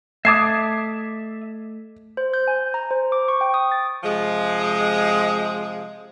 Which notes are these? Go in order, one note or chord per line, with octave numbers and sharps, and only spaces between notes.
A3 E5 A5 D6 D#6 G#6 C7
C5
G6
G#5
A#5
C5
D6
C#6
G5
D#6
A6
C3 F3 G#3